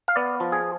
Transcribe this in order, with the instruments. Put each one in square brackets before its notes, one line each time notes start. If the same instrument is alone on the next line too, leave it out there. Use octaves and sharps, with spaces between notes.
[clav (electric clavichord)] F5
B3 D5
F3
G#4